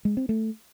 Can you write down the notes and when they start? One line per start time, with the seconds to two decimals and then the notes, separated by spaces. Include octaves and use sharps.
0.05 G#3
0.17 C4
0.29 A3